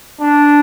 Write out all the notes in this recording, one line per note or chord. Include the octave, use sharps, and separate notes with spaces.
D4